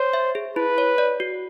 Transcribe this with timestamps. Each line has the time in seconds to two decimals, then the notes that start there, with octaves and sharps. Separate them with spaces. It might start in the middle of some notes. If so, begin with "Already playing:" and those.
Already playing: C5 C#5
0.13 E5
0.35 G#4
0.56 E4 B4
0.78 C#5
0.98 D5
1.20 F#4